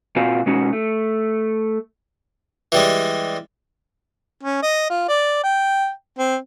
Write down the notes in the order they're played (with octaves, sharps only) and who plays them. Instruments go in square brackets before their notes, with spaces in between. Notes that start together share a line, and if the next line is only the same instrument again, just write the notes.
[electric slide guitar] A#2 C4 F4 F#4 G#5
B2 G#3 C#4 D#4 F#4
A3
[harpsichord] E3 G3 G#3
[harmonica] C#4
D#5
F4
D5
G5
C4